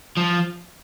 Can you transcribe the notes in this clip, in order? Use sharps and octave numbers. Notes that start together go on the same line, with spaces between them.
F3